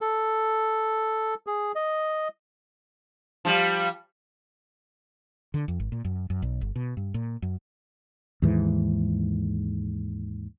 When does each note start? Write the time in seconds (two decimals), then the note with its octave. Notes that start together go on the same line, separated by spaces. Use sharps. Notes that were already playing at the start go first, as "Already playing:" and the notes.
0.01 A4
1.47 G#4
1.75 D#5
3.45 F3 G3
5.54 D3
5.68 F2
5.80 G#1
5.92 A#2
6.05 F#2
6.30 F#2
6.42 B1
6.61 G1
6.76 B2
6.97 G2
7.14 A#2
7.42 F#2
8.42 D#2 G#2 E3